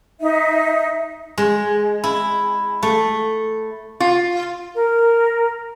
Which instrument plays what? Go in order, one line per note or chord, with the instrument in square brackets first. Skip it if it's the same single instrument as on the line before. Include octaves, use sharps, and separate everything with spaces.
[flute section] D#4 E5
[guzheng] G#3
E4
A3
[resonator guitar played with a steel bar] F4
[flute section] A#4